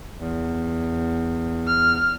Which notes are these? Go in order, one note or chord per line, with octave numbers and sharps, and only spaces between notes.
E2
F6